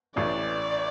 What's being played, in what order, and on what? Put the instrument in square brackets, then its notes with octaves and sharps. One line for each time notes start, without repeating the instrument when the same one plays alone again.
[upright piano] A1 A2 E3 [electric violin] D5